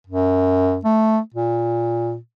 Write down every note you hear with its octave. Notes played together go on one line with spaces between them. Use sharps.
F#2
A3
A#2